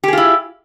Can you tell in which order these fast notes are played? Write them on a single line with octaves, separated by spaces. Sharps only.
G4 G#4 F4 E4